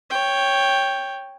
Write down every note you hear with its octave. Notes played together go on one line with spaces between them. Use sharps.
C#5 G5